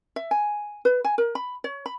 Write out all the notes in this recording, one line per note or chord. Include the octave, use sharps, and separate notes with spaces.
E5
G#5
B4
G#5
A#4
B5
C#5
B5